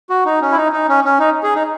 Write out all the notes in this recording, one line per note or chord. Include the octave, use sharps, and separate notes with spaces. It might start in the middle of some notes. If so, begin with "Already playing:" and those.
F#4
D#4
C#4
E4
D#4
D#4
C#4
C#4
D#4
G#4
D#4